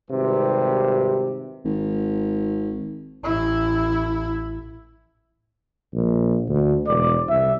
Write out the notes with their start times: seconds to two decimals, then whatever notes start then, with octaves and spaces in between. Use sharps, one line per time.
0.10 G#1 C3 G3 G4 B4
1.65 G#1
3.24 A1 E4
5.94 A#1
6.49 D2
6.88 E1 D5
7.29 C2 E5